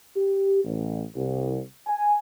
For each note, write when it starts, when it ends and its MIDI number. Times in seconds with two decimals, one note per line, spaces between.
0.16 0.62 67
0.64 1.03 33
1.16 1.60 36
1.87 2.16 80